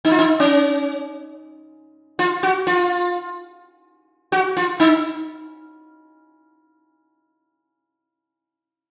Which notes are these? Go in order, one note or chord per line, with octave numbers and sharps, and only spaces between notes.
D#4
F4
D#4
C#4
F4
F#4
F4
F#4
F4
D#4